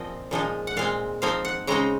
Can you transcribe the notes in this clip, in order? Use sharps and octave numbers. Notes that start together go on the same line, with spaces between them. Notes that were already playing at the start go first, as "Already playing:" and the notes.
Already playing: A#2 F3 C4 D#5
A#2 F3 G#3 D#4
F#5
A#2 G#3 C4 F5
F3 C4 D#4 F5
F#5
C#3 G#3 C4 D#4 A#5